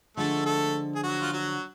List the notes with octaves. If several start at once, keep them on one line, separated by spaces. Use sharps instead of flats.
D3 F3 G#3 A3 A4
A3 A4
G#4
F#3 F#4
F4
F#3 F#4